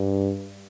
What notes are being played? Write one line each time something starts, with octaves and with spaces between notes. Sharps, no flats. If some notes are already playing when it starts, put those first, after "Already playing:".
Already playing: G2